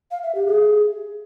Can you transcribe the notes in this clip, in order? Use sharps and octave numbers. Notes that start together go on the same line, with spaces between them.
F5
E5
G4
G#4